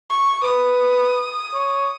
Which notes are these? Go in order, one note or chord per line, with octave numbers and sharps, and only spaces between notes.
C#6
B4 D#6
C#5